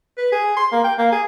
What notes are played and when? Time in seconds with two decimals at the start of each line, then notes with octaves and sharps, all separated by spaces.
0.17 B4
0.32 G#4
0.57 C6
0.72 A#3
0.84 G5
0.98 A#3
1.12 G#4